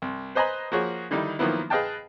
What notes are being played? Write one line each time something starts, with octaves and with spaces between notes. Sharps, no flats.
C2
B4 C5 D#5 G#5 A#5 B5
F3 A#3 F#4 G#4 C#5
D3 D#3 G3 D#4 E4
D#3 F3 F#3 A#3 B3 E4
G#4 B4 D#5 F5 G5 A5